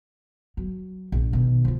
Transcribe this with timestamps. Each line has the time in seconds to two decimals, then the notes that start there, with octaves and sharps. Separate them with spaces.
0.57 F#3
1.12 A#1 A3
1.33 B2 D#3
1.65 F3 F4